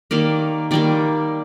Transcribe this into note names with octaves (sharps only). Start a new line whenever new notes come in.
D#3 G3 A#3 D5
D#3 G3 A#3 D5